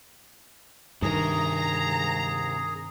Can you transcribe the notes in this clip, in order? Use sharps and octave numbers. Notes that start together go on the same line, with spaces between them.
G2 C3 D#3 G#4 A#4 A#5